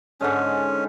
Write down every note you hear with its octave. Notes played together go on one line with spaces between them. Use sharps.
G#2 D3 G#3 C#4